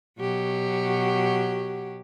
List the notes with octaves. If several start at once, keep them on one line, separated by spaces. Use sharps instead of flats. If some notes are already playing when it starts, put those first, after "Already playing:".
B2 F#3 G4